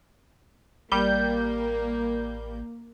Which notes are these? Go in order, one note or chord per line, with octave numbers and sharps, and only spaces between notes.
A1 G3 A#3 G6